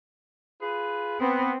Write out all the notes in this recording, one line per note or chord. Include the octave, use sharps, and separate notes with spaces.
F4 G#4 B4
B3 C4